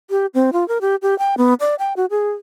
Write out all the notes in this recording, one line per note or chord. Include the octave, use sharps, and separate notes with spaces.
G4
C4
F4
A#4
G4
G4
G5
B3
D5
G5
F#4
G#4